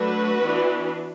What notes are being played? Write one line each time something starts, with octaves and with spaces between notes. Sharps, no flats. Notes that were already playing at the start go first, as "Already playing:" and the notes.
Already playing: F#3 A3 D4 F#4 B4
E3 B3 D4